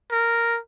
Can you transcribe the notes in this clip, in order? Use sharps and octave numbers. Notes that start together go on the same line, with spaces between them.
A#4